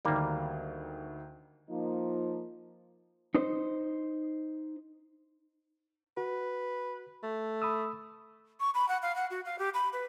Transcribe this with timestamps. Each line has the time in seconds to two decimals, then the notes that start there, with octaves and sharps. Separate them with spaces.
0.05 D2 D#3 G3 A#3
1.69 F3 A#3 D#4
3.35 D#4 C5
6.17 F#4 B4
7.23 A3
7.62 B5 D#6 E6
8.60 C#6
8.74 B5
8.88 F#5
9.02 F5
9.16 F#5
9.31 F#4
9.45 F5
9.59 G4
9.74 B5
9.93 B4